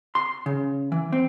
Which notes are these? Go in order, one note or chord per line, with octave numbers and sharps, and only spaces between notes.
C6
C#3
E3
C4